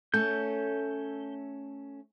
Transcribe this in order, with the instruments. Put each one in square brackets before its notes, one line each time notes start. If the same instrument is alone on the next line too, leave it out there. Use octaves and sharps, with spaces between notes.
[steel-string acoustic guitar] A3 C#4 A4 [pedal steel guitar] G6